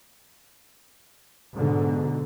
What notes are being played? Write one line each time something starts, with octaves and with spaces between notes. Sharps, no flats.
G#2 B2 D3